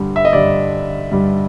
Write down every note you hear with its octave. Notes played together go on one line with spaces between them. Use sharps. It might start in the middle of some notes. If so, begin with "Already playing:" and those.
Already playing: G2 D3 G3
E5
D#5
G2 D3 G3 D5
G2 D3 G3